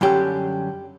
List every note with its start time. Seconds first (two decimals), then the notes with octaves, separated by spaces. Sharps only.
0.01 F#2 D3 G3 C#4 G4